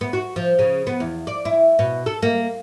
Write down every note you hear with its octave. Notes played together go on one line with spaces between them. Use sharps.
B3
F#4
F3
C#3
B3
E2
D5
E4
B2
A4
A#3